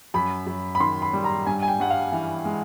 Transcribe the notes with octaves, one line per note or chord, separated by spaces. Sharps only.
F#2 B5
F#2
B5
D#3 C6
B5
G3
A#5
G2 G#5
G#5
G5
G2 F#5
F5
E3
G#3